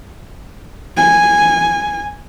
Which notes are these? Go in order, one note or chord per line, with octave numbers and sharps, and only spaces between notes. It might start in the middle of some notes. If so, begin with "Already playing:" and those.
G#5